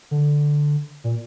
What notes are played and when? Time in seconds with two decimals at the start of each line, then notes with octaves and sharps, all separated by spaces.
0.11 D3
1.04 A#2